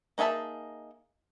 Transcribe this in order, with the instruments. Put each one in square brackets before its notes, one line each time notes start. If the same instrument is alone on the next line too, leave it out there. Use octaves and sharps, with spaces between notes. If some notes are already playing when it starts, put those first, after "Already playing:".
[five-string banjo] A#3 D#4 G#4 E5 A5